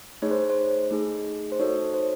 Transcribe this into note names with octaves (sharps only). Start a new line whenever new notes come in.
A3 D#4 G#4 C#5
C5
C5
A3 D#4 G#4
C5
D#4 F#4 A4 C#5
C5